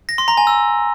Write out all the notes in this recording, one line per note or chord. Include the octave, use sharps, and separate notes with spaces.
A#6
C6
A#5
G#5
E6